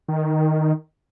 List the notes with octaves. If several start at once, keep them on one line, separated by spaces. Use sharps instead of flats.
D#3